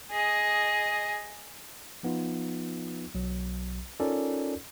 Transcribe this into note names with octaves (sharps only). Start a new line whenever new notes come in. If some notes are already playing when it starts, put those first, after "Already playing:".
G#4 D#5
F3 B3 D#4 F4
B1 F#3
C#4 D#4 F4 A4 A#4 D5